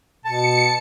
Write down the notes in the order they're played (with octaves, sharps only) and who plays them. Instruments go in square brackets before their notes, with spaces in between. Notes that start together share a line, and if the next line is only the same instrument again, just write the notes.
[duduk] B2 [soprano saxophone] A5 [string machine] C#7